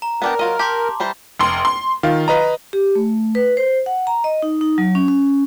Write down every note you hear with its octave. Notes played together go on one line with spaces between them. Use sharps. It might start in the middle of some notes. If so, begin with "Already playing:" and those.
A#5
B3 D4 A#4 G5
F#3 F4 D#5
G4 A5 C6 D6
E3 G3 C5
F1 C6
C6
D#3 F4
B4 D#5 A#5
G4
A3
B4
C5
F#5
A#5
D#5
D#4
D#4
F#3
C#4
C#4